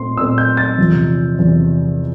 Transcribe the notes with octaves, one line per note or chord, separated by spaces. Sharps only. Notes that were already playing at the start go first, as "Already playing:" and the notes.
Already playing: A#2 A3 C4 C6
A#2 A3 C4 E6
G6
A6
E2 C3 F3
E2 C3 F3